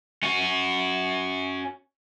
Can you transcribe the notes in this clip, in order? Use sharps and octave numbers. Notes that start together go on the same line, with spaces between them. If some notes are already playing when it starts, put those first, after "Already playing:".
C#4 F#4